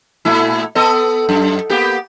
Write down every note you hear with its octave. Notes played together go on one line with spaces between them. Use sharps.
A#2 A3 E4
B3 A4 D#5
F#2
A#3 B3 G4